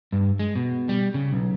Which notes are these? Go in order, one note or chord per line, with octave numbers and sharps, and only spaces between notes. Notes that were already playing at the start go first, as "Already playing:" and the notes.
G2
G#3
B2
G3
C#3
B1